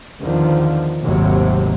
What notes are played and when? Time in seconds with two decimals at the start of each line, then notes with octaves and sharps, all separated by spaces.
0.21 E2 D3 D#3 F3
1.02 G#1 D#2 A2 C3 F#3